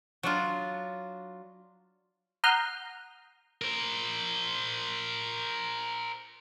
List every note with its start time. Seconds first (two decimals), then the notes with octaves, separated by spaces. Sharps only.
0.23 F#3 D4 F4
2.44 F#5 A#5 D#6 F6 G6 C7
3.62 A#4 C5